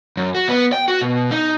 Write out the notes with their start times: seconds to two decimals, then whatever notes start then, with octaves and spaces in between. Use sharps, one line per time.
0.17 F#2
0.35 F#4
0.49 B3
0.73 G5
0.88 F#4
1.01 B2
1.32 D#4